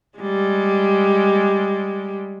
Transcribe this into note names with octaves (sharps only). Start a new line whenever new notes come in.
G3 G#3